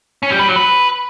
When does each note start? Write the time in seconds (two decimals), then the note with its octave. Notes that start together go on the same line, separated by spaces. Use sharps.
0.23 C#4
0.31 G3
0.39 B4
0.48 F#3
0.56 B4